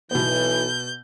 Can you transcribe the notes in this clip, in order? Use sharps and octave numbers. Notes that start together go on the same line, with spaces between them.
B1 B2 E3 B3 G6